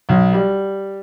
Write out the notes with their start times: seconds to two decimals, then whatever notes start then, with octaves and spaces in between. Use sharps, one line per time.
0.09 B1
0.32 G3